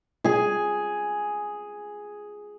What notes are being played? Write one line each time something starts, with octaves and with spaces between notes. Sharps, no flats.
G#4 G#5